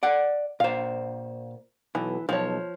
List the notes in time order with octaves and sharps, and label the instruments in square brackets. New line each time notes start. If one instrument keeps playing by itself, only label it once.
[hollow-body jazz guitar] D5 F#5
[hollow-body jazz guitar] A#2 C5 [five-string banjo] F5
[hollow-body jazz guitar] B1 [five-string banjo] E3
[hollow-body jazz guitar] B1 [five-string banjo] F3 C#5